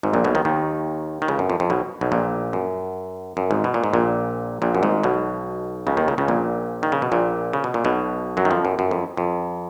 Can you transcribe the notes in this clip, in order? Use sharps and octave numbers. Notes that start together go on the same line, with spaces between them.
G#1 G#2
A#1 A#2
B1 B2
D#2 D#3
D#2 D#3
D#3
C#2 C#3
F#2
F2
F2
B1 B2
B1 B2
A#1 A#2
F#2
F#2
G#1 G#2
B2
A#2
G#2
A#1 A#2
A#1 A#2
F#2
G#1 G#2
B1 B2
C#2 C#3
D#2 D#3
C#2 C#3
C#2 C#3
A#1 A#2
D#3
C#3
B2
A#1 A#2
C#3
B2
A#2
B1 B2
F#2 F#3
D#3
F2 F3
F#2
F#2
F2
F2